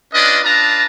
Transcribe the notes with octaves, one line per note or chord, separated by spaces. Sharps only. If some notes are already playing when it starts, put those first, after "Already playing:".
C#4 D4 F4 B4 D5 D#5
D4 F4 B4 A5 A#5